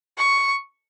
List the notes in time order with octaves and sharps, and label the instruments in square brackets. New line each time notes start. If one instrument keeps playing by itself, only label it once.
[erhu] C#6